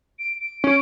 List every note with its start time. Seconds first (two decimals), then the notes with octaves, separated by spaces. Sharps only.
0.19 D7
0.40 D7
0.64 C#4 D7